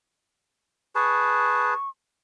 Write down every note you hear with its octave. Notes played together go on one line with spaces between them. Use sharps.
G#4 B4 A5 C#6